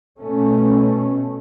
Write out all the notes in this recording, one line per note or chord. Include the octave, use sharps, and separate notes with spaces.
B2 A3 C#4